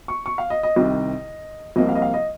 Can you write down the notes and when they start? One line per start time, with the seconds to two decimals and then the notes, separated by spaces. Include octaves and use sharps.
0.08 C#6
0.26 C#6
0.38 F5
0.50 D#5
0.63 D#5
0.76 C2 C3 D#3
1.76 C2 C3 F3 A#3 D#5
1.89 F5
1.95 D#5
2.02 F5
2.14 D#5